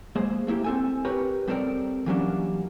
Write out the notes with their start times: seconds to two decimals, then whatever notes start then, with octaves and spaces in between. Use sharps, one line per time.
0.16 G#3 A#3 G#4 C5
0.47 A3 A#3 E4 G4
0.64 C4 A4 G#5
1.05 G4 A#4 B4 C#5
1.48 G3 C4 A4 A#4 D5
2.06 E3 F#3 G3 A#3 C#4 D4